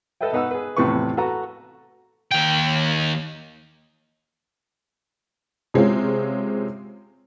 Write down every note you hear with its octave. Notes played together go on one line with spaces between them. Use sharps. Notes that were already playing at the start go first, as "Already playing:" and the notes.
A4 B4 D#5 E5 G5
B2 D#4 B4 F#5 E6
G#4 B4
E2 A2 C3 F3 B4 C#6
F#4 A4 B4 A#5
D#2 G5
C3 G#3 C4 C#4 F4